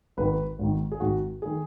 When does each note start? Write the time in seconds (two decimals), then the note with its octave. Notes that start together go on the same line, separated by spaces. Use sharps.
0.17 G#1 G#2 D#3 B4
0.59 G#1 G#2 D#3
0.92 G#4
1.00 G#1 G#2 D#3 F#4
1.42 D#3 G#4